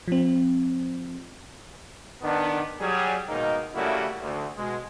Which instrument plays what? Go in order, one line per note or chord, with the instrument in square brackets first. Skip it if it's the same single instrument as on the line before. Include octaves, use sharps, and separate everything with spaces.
[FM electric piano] F3 C4
[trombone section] D#3 B3 D4
F#3 G3 G#4
G#2 B2 D#3 A#3 D#4
C#3 G3 A3 A#3 E4 F#4
D2
B2 G#3